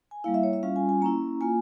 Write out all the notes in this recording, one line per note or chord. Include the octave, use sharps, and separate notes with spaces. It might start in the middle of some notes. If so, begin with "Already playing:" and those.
G#5
G3 A#3 E4 F5
E5
C#5
E5
G3 C#4 F4 F5
G#5
G#5
A#3 C#4 E4 A#5
A#3 F4 G#5